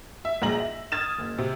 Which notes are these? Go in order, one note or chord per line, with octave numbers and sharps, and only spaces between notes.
E5
A#1 G#2 G#4 A#5 A#6 F#7
E5
D#6 F6 G#6 A6 E7
F#1
C3